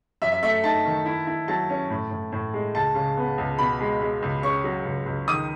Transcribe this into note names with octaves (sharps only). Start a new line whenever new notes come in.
F#2 E5
E5
A3 E5
D#4 A5
D#3
E4
E4
F#3 A5
C#4
A2
A2
A2
G#3
C#2 A5
C#3
B3
C#2
B2 B5
G#3
G#3
C#2
C#4 C#6
F#3
C#2
C#2
D#3 D#6